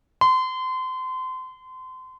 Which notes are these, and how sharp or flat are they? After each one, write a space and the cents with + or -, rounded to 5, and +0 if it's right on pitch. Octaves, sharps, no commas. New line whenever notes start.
C6 -30